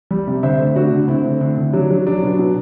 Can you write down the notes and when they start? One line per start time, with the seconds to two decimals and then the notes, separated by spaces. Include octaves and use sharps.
0.11 G3
0.27 C3
0.43 D3 C5 E5
0.59 A3
0.76 D3 D4 F#4
0.92 D3
1.08 D3 C4 E4
1.24 A3
1.41 D3
1.58 D3
1.73 F#3 D4
1.90 F#3
2.07 F#3 D4
2.23 B2
2.39 B2